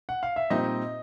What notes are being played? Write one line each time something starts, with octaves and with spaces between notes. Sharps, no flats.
F#5
F5
E5
A#2 G3 C4 D#4 D#5